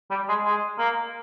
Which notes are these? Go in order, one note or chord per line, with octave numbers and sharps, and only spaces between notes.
G3
G#3
G#3
A#3